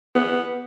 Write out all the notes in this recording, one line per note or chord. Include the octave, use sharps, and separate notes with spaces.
B3